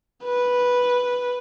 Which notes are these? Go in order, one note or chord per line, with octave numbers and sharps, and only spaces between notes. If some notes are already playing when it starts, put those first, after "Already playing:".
B4